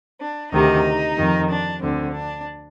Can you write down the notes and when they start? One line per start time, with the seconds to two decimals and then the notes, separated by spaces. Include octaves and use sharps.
0.20 D4
0.52 D2 C3 D#3 D#4
1.17 F2 D#3
1.50 D4
1.82 D2 D3 C4
2.14 D4